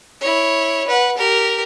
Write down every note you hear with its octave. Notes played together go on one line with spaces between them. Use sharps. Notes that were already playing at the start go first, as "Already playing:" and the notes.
E4 C#5
B4 F#5
G4 A#4